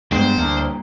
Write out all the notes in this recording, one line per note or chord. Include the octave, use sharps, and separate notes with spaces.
G2 G#3 B3 G#4 C5 G5
D2 G2 A#3